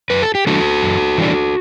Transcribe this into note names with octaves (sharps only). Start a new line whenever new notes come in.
F#2 B4
A4
G4
E3 G3 D4 F#4 A4
F#2
E3 G3 D4